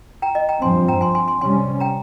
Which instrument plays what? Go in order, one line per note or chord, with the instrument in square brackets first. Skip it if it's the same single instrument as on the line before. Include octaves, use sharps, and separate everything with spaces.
[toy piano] G5 A#5
D#5 G5
G5 A#5
[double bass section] G2 F3 C4 [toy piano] G#5 C6
[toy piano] G5 A#5
G#5 C6
G#5 C6
G#5 C6
[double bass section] C3 G3 C#4 [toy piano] G#5 C6
[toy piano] G5 A#5